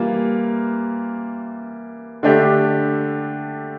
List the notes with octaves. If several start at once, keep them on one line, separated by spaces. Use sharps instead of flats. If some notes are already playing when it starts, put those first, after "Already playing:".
Already playing: E3 G3 A#3 F4
D3 A3 D4 G4